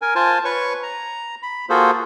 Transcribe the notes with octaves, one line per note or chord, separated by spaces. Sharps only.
A#4 G#5
F4 C5 G#5 A5
B4 C#5 C#6
A#5
B5
A#3 F4 F#4 G#4 A4 C5